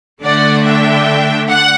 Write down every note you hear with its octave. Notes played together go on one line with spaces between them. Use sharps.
D3 A3 D4 D5 F#5
E5 G5
F#5